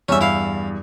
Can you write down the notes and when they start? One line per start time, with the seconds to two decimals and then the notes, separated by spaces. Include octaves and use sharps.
0.09 E2 G2 C#4 E5
0.21 E4 F5